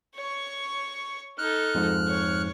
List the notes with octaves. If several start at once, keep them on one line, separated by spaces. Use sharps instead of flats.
C#5 C#6
D#4 A4 F6 F#6
F2 G#2
C#5